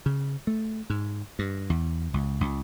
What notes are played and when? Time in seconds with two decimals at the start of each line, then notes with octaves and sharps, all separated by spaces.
0.06 C#3
0.47 A3
0.90 G#2
1.39 G2
1.70 E2
2.14 C#2
2.41 C#2